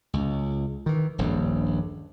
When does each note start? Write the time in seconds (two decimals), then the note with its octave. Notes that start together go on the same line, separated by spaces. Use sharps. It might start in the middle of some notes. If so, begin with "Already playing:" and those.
0.13 C#2
0.86 D#3 E3
1.18 D#1 A#1 G2